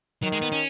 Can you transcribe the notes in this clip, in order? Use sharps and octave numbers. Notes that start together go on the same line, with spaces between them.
D#3 F#3
G#3
B3
C#4